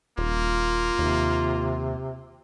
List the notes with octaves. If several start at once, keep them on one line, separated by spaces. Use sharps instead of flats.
D#1 A#3 F4
D#2 C3